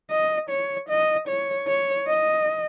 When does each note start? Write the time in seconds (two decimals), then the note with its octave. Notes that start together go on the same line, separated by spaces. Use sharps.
0.11 D#5
0.50 C#5
0.89 D#5
1.28 C#5
1.68 C#5
2.07 D#5